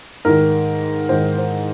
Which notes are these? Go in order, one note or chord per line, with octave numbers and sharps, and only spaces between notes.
G#2 D#3 A#4
G#2 D#3 C5
C5